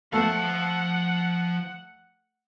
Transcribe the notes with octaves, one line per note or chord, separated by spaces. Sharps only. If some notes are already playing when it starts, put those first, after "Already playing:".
F3 A3 F5 F#5